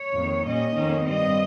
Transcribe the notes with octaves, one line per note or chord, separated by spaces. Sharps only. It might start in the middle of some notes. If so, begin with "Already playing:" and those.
Already playing: C#5
F2 D#3 A#3
A#2 G3 C#4 D#5
F2 D#3 A#3 C#4
G2 G3 C4 D#5